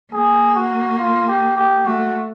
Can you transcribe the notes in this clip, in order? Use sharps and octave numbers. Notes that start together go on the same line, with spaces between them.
A#3 G#4
F#4
F4
G4
G4
A3 F#4